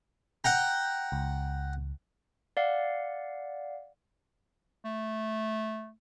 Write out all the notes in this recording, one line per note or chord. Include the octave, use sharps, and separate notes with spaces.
F#5 G5 A#5 G6
C#2
D5 F5 F#5
A3